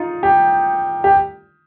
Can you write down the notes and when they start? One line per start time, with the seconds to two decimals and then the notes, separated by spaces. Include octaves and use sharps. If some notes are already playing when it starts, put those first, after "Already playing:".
Already playing: D#4 F4
0.23 G4
1.04 G4